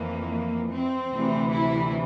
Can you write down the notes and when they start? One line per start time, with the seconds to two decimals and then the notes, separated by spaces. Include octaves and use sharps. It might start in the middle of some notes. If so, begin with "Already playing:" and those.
Already playing: F2 E3 A#3
0.71 C4
1.12 D2 C3 E3
1.54 E4